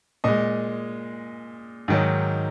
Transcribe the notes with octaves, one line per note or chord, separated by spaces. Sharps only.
A#2 G#3 D#5
G#2 D#3 F#3